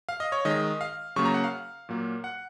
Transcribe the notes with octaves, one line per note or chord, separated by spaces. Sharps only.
F5
D#5
C#5
D#3 G#3 D#5
F5
C#3 F#3 A#3 C#6
A#5
F#5
F5
A#2 F#3 A#3
F#5